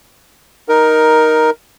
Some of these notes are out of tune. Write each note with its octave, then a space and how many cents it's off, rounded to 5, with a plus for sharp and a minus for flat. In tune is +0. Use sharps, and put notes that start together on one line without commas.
D#4 +0 A#4 +10